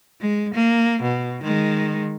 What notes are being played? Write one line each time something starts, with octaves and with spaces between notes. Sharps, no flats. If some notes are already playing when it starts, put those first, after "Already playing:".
G#3
A#3
B2
D#3 G#3